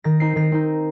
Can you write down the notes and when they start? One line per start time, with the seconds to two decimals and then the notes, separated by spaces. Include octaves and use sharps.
0.04 D#3 A#6
0.20 C4 D#4 C7
0.36 D#3 A#6
0.52 C4 D#4